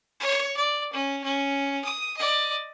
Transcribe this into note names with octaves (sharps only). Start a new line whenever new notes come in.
C#5
D5
C#4
C#4
D#6
D5 D#5